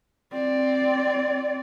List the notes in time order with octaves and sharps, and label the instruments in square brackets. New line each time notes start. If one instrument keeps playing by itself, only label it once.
[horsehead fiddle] C4 D5